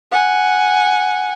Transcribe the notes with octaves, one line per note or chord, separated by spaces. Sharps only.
F#5 G#5